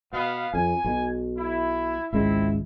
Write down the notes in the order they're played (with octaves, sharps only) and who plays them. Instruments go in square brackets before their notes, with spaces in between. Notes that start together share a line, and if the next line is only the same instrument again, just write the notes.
[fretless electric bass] B2 [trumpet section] B3 F5
[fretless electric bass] F2 [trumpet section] G#5
[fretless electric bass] B1 B2
[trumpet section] E4
[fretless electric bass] G#1 C#2 G#3 [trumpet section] C4 E4 E5